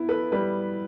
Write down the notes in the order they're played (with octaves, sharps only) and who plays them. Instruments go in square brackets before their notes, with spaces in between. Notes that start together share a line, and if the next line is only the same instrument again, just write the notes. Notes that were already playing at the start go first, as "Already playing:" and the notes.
Already playing: [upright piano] B3 E4
[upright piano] A4 [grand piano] B4
[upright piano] G3 [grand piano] B4